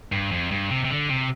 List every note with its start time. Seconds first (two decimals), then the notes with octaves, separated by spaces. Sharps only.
0.12 G2
0.32 F2
0.51 G2
0.71 C3
0.85 C3
0.90 D3
1.10 C3